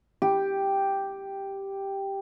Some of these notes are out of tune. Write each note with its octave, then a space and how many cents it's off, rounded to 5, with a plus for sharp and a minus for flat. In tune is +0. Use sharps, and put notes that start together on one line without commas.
G4 +0